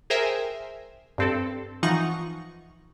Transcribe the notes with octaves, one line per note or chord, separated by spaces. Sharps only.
G#4 A#4 C5 E5 G5 G#5
G2 C4 A4
E3 F3 D#4 F4 F#5 C#6